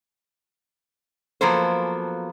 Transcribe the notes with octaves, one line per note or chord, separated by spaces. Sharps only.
F3 F#3 A#3 B3 A4 C5